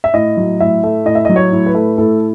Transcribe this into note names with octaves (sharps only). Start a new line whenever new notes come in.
E5
A2 D#5
F#3
A2 E5
A3
A2 D#5
E5
F#3 D#5
C#5
A2
B4
A3
A2 A4